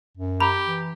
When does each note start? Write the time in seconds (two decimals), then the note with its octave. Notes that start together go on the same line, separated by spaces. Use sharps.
0.17 F#2
0.40 G4 A#5 B5
0.66 E3